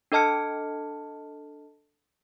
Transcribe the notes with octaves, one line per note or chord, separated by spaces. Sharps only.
D4 A4 D#5 A5 F6 C#7